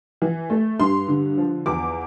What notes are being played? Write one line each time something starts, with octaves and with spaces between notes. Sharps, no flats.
E3
A3
G2 C6
D3
F3
E2 D6